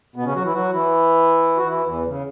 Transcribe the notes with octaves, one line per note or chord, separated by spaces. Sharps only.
B2 B3
C#3 C#4
F#3 F#4
E3 E4
F#3 F#4
E3 E4
F#4
E3 E4
E2 E3
C#3